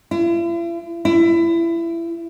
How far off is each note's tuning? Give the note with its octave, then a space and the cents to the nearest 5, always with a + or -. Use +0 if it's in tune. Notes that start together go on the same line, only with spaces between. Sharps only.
E4 +45
E4 +25